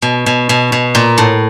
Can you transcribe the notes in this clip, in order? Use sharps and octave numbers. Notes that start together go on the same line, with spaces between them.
B2
B2
B2
B2
A#2
A2